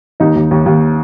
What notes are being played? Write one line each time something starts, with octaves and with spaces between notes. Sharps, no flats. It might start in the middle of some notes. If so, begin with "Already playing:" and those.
D#2 D#4 D#5
D#2
D#2
D#2